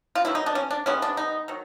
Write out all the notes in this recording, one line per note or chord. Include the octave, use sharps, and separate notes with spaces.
F4
D#3 F#3 B3 E4
D#4
D4
C#4
D4
C3 D#3 G#3 B3 C#4
D4
D#4
D#3 F#3